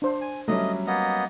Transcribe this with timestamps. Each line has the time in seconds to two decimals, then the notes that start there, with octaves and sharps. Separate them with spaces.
0.02 D4 C5
0.21 G#5
0.48 F#3 G3 A3 C#4 D#5
0.87 A#3 B3 D#5